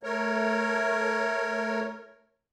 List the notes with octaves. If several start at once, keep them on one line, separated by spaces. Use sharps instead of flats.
A3 A#4 C#5